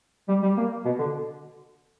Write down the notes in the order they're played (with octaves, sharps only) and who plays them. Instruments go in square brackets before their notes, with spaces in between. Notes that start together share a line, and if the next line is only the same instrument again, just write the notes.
[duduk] G3
G3
A#3
B2
D3